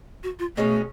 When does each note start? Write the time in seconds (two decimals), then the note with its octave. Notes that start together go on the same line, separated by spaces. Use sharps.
0.23 F#4
0.39 F4
0.57 B2 G#3 A3 C#4